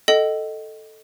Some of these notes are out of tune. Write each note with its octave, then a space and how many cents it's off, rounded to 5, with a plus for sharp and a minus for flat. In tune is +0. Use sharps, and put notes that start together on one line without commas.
A4 +0 D#5 +0 G5 -45